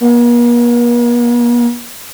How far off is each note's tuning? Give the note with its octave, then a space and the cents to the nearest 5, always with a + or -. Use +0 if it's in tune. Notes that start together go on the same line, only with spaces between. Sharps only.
A#3 +45